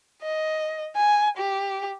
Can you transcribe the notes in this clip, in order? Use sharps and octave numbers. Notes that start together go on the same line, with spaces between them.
D#5
G#5
G4